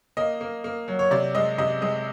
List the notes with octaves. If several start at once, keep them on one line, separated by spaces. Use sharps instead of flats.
A#3 D#5
A#3
A#3
F#3
C#5
C3 D5
G#3 D#5
C3 D#5
G#3 D#5